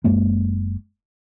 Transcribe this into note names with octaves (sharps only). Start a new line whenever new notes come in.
F#1 F#2 G#3 A#3